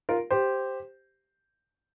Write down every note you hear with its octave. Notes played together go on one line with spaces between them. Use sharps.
F4 A#4
G4 C5